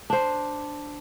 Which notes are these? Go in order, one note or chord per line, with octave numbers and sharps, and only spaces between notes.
D4 C5